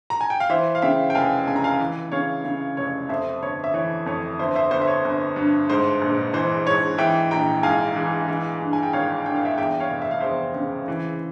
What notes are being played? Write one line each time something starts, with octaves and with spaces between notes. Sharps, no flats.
A#5
G#5
G5
F5
E3 C5 E5
F5
C#3 E5 G5
G5
F1 F5 G#5
C#3 G#5
A#5
F5 G#5
E3
C#3 C#5 F5
C#3
F1 C#5
F2 C5 E5
G1 C#5
E5
E3 C#5
F2 C#5
G1 C5 E5
C5 E5
G1 C5
E5
C#5
G1
G2
G#2 C5
A#1
E3 C5
G#2 C#5
E3 E5 G5
A#1 G5 A#5
G#2 F5 G#5
E3
E3
G2
G#5
G5
G#1 C#5 F5
G2 G5
F5
E5 G5
E2 E5 G5
C#5 F5
F1
E5
F5
E2 C5 E5
C#3
E3